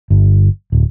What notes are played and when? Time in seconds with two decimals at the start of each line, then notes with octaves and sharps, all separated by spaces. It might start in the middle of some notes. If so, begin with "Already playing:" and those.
0.10 G1
0.72 D1